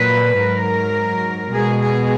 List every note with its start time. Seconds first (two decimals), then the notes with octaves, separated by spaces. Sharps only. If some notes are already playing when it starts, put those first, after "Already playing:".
Already playing: A#2 F#3 B4
0.38 G#2 F#3 A#4
1.54 B2 G#3 G#4
1.82 G#4